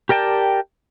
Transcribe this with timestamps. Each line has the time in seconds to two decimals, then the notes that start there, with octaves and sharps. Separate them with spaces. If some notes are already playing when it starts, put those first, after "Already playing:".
0.09 G4 A#4 D5 G5 A5